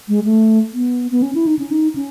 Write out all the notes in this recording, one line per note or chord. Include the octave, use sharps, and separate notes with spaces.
G#3
A3
B3
B3
C#4
E4
D#4
C#4
D#4
C#4